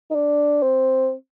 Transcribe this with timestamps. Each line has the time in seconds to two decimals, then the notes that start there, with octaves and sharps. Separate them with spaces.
0.11 D#4
0.15 D4
0.62 C4